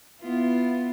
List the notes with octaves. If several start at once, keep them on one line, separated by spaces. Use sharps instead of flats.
B3 E4 F4